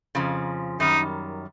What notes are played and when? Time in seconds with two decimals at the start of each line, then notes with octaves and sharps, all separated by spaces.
0.15 F2 C#3 F3
0.80 F#2 D#3 G3 D#4